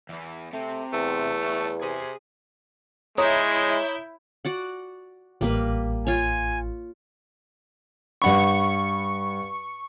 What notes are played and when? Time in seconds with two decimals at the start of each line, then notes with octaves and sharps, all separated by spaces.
0.09 E2 E3
0.53 C3 A3
0.93 E2 A3
1.43 C#5 A5
1.82 C3 G#4
3.18 G#3 E4 C#5 A#5 D#6 G6
4.45 F#4 D5 F#5
5.41 A1 G3 A#3 B4
6.07 F4 C#5 G#5
8.22 G2 F#5 B5 C#6